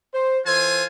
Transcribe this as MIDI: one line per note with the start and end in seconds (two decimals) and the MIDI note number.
0.14 0.39 72
0.46 0.84 52
0.46 0.85 65
0.46 0.84 69
0.46 0.84 72
0.46 0.85 80